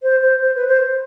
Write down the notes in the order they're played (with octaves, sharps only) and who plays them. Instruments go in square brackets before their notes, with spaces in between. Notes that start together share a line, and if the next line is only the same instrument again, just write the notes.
[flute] C5
C5
C5
B4
C5